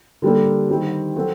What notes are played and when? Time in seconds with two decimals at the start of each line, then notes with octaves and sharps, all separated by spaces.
0.22 D3 G3 A#3 D4 A4
0.69 D#3 G3 C4
1.16 F#3 C4 F#4 A4